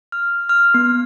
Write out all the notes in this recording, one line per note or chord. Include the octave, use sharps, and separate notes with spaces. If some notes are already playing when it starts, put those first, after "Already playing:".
F6
F6
B3